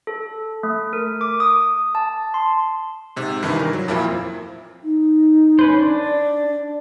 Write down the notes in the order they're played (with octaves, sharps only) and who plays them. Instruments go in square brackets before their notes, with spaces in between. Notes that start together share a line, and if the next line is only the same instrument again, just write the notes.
[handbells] A4
A3
A#4
D6
D#6
A5
C6
[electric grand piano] G#2 C3
G2 D#3 E3 E4
A#4
F#3
F2 A#2 A#3 C4 E4
[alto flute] D#4
[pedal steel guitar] C#4 B4 C5
D4
[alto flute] D5